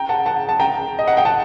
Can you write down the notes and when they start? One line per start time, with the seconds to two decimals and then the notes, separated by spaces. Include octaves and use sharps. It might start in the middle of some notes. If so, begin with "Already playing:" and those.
Already playing: G5 A#5
0.09 F#5 A5
0.26 F#5 A5
0.49 A5
0.60 G5 A#5
0.99 D#5
1.08 F#5
1.17 G5
1.25 F#5 A5